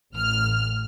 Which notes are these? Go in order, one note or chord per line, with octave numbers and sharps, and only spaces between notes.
A1 F6